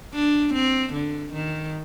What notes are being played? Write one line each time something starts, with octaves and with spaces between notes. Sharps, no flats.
D4
C4
D3
D#3